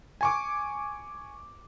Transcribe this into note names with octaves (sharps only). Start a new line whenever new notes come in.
G#5 C#6 D6